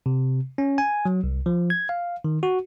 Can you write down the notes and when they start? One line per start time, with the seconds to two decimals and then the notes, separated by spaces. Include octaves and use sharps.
0.06 C3
0.58 C#4
0.78 G#5
1.05 F#3
1.23 C2
1.46 F3
1.70 G#6
1.89 F5
2.24 D#3
2.43 F#4